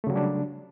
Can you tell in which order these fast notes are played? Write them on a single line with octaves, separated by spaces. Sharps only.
A3 C#3 F#3 G3 D4